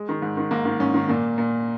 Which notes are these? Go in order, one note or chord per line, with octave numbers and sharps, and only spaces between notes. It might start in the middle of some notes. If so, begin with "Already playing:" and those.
Already playing: G#3
D#3
G#2
D#3
G#2 A#3
D#3
G#2 C#4
D#3
A#2 A#3
A#2